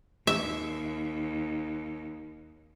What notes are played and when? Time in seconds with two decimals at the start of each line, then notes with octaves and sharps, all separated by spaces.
0.27 D#2 E5